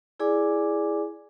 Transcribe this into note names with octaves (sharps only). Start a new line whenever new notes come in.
E4 G#4 D5 G#5 D6